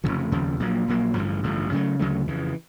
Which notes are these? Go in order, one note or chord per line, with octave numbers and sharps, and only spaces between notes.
F1 D#2 C#3 F3
F1 D#2 C#3 F3
A#1 A#2 F#3 A#3
A#1 A#2 F#3 A#3
A1 G2 D3 F3
A1 G2 D3 F3
D2 C#3 F#3 A3
D2 C#3 F#3 A3
F2 C#3 E3